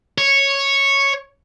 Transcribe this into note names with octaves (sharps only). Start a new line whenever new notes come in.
C#5